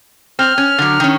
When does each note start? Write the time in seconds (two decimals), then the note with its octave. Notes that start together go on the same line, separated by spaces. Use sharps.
0.39 C4 F6
0.58 C#4
0.78 D3 F#3
1.00 D#3 C#4